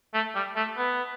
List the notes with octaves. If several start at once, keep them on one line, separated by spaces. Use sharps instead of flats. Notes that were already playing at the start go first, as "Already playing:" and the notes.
A3
G3
A3
B3